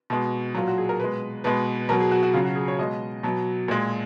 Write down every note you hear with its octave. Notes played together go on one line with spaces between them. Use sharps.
B2 G#3
A#2 F#3 F4
F#4
G#4
A#4
B2 G#3 B4
B2 G#3 B4
B2 F#3 A#4
G#4
F#4
F#4
C#3 F#3 F4
F#4
G#4
C#5
B2 G#3 D#5
B2 F#3
A#2 G#3